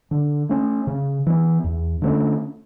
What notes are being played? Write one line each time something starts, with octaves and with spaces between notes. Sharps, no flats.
D3
A3 C#4
C#3
E3 B3
E2
D3 A3 C#4